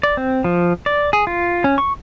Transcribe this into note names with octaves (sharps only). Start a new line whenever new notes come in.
D5
C4
F3
D5
G#4
F4
C#4
C#6